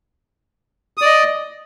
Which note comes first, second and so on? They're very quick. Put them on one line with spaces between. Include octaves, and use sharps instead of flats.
D#6 D5 D#5